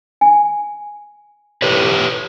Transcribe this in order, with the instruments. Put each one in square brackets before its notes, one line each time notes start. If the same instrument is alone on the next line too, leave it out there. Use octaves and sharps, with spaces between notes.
[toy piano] G#5
[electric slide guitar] G4 B4 C#5